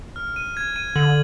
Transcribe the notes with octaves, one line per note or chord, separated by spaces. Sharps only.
F6
D#7
G#6
D#7
D3 F#7